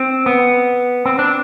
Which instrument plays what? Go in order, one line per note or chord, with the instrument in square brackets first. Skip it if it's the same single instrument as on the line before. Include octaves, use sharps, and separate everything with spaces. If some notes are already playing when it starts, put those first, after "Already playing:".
Already playing: [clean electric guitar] C4
B3
C4
D4